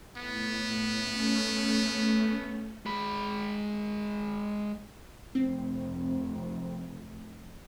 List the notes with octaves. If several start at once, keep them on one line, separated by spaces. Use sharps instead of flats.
A2 B3
A3 C#4
G#3 B5
F1 C4